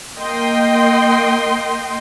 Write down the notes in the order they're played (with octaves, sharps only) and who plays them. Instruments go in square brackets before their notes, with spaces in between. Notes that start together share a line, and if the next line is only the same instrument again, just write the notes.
[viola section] A#3 D#5 G5 C6